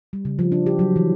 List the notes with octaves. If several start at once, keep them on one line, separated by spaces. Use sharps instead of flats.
G3
C#3
F3
D4
G4
F#3
E3